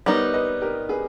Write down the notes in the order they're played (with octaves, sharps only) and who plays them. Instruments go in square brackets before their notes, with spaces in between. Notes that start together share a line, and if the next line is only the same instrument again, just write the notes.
[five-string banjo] G3 B3 D#4 [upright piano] A#4 C#5
[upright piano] B4 D#5
G4 A#4
G#4 B4